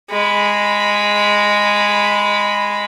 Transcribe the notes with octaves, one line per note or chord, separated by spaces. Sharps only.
G#3 B5